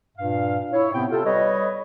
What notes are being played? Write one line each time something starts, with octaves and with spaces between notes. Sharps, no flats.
G2 A#2 F5
E4 C#5
A2 C3 B3 C4 G5
C3 F4 G4 A4
G3 B4 C#5 D#5